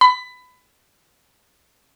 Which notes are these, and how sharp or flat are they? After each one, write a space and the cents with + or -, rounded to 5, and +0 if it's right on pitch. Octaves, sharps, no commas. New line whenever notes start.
B5 +20